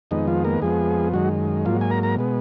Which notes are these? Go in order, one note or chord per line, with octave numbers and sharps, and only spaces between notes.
F2 D#3 G#3 B3 D#4
F3 F4
A#3 A#4
F2 F3 G#3 B3 G#4
F#2 D#3 F#3 G#3 F#4
G#2 F3 F#3 A#3 F4
G#5
A#4 A#5
A#4 A#5
B2 G#3 B3